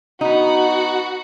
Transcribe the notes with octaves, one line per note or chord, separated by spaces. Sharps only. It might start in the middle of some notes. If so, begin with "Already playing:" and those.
B3 D#4 F#4